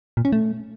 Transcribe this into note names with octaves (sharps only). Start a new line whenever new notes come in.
A#2
C#4
A3